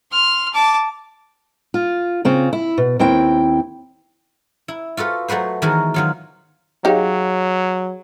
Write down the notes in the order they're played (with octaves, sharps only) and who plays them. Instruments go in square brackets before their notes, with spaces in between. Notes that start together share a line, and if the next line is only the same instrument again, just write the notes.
[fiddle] C6 F6
A5 D6
[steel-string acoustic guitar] F4
C#3 C4 F4
E4
B2
D#2 C4 E4 G5
[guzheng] E4
F4 F#4 A4 B4
F#3 A3 F#4 B4 C5
D#3 E3 G#3 B3 F#4 A#4
D#3 F#3 F4
[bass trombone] F#3 [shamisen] D#4 G4 [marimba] G#4 C#5 F5